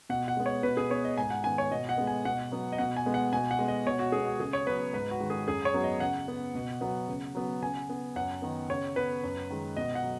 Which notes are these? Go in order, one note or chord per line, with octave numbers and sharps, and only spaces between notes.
B2 F#5
F#5
G#3 B3
C#5
B2 B4
G#4
B3 C#5
D#5
G#2 G#5
F#5
D#3 B3 G#5
C#5
B2 D#5
F#5
G#3 B3
G#5
B2 F#5
F#3 B3
D#5
B2 F#5
G#5
G#3 B3
F#5
B2 G#5
F#5
G#3 B3
D#5
B2 C#5
F#4
G#3 B3 G#4
F#4
C#3 G#4
C#5
F#3 B3 B4
G#2 B4
F#4
D#3 G#3
G#4
F#2 G#4
C#5
F#3 B3
D#5
C#3 F#5
B3
B2
F#3 B3
C#3
F#3 B3
C#3 G#5
B3
F#2 F#5
D#3 B3
C#3 C#5
B3 B4
F#2
D#3 G#3
B2 D#5
F#5
F#3